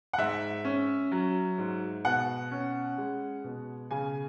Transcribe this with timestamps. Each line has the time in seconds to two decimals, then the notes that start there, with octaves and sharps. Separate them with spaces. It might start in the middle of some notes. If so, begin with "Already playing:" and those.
0.13 F#5
0.18 G#2 E5
0.65 C#4
1.12 F#3
1.58 G#2
2.05 B2 F#5
2.51 C#4
2.98 G#3
3.44 B2
3.91 C#3 G#5